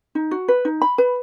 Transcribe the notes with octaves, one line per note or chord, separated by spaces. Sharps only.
D#4
F#4
B4
D#4
B5
B4